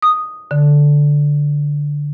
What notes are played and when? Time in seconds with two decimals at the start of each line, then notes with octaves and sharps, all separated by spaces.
0.02 D#6
0.51 D3